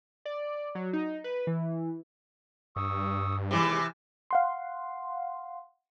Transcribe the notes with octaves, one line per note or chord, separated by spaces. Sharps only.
D5
F#3
D#4
B4
E3
G2 C#6 D#6 E6
D#2 C3 E3 G#3
F5 F#5 C6